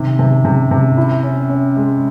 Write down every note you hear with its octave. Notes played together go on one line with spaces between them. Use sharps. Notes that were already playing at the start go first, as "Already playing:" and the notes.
Already playing: C3 D#3
C3
C3
C3
E4
C#4
C#4
G#3